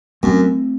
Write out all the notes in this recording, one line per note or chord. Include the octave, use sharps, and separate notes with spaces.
F#2 A3 C4